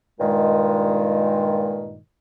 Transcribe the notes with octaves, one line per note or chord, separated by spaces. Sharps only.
G2 A#2 D#3 G#3